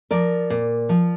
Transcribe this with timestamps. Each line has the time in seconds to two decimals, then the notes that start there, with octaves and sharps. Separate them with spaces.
0.11 F3 A#4 D5
0.50 A#2
0.89 F3